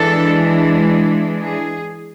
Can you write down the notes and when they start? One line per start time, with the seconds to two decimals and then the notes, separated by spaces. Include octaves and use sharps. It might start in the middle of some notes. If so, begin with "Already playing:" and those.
Already playing: E3 G#3 D4 A4
1.40 G#4